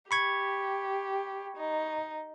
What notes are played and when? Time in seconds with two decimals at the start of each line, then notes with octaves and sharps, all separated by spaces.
0.11 G4 B5 C#6 G#6
1.57 D#4